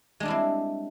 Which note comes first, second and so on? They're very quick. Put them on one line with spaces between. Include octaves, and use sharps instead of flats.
G#3 D4 G3 E4 C4